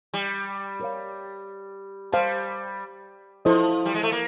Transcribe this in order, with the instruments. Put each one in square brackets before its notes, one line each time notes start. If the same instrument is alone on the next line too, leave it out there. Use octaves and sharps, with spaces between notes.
[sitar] G3
[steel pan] G4 A#4 C#5 F5
[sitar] G3 [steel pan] C5 F5 A5
[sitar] F3 [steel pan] E4 A4 C5 D#5
[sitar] G3
G#3
A3
A#3